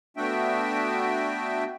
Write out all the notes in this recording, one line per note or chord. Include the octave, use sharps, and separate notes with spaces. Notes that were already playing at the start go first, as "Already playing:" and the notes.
A3 B3 D4 F#4 E5 G5